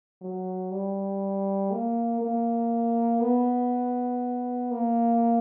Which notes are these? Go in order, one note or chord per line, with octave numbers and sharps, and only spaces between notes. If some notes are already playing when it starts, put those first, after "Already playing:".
F#3
G3
A#3
A#3
B3
A#3